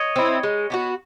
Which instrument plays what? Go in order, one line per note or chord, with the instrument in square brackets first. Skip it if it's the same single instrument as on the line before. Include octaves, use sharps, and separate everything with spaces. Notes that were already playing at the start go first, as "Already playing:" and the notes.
Already playing: [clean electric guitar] C#5 D#5
[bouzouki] C4 E4
G#3
B3 D4 F#4